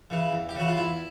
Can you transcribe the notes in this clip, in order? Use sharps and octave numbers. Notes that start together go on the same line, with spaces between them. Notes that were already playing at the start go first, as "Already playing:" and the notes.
C#3 E3
E2
G4
C#3 E3 F#4
F4
E2 E4